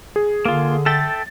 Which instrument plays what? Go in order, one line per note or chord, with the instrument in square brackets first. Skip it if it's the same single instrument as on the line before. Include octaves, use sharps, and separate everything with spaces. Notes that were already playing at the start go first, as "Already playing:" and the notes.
[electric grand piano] G#4
[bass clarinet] D3 [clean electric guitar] A#3 F4
[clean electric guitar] A4 E5 G5 [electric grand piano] A6